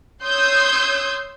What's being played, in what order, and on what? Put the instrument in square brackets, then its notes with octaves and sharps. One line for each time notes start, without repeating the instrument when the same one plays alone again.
[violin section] C#5 C6 D#6 E6 G6 G#6